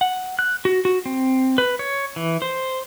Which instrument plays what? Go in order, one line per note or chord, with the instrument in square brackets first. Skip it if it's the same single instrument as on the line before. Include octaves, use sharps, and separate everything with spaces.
[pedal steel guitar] F#5
F#6
F#4
F#4
C4
B4
C#5
E3
C5